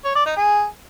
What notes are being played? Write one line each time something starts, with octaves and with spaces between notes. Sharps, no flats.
C#5
D5
D#4
G#4